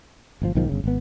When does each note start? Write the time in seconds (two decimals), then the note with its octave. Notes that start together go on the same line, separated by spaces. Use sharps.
0.42 G1 B2 F3
0.55 B1 G#2 D#3 F3
0.69 G1 C#3
0.84 G#1 B3